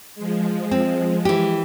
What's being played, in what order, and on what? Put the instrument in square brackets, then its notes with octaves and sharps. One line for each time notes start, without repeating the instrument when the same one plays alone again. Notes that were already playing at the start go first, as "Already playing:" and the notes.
[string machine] F3 G#3
[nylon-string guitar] C4
E3 G4